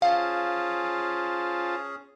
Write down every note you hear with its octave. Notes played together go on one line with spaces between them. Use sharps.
C#4 F4 G#4 C5 F5 A5